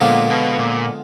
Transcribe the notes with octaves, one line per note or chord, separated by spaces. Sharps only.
A#2 D3 F3 G#3 B3 F4
B2
A#2